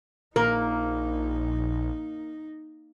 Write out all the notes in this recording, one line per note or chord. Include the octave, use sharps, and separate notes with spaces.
A#1 A#3 D#4 A#4